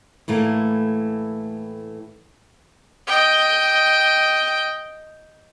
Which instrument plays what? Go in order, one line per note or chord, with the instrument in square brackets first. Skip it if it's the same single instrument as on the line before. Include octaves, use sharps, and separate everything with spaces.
[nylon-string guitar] A2 E3 A3 A#3
[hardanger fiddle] D#5 G5